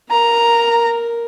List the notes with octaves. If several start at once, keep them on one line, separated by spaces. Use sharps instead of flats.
A#4 A#5